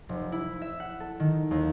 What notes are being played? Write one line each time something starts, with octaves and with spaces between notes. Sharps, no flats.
F1
E4
E5
F#5
A4
D#3
D#2